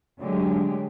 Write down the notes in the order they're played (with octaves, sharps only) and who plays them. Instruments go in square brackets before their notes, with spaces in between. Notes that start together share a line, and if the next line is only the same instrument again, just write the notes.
[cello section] D3 F#3 G#3 A3 G4 G#4